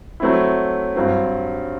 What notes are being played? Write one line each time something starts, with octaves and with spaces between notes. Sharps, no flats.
F#3 A3 C4 E4
G2 F#3 C4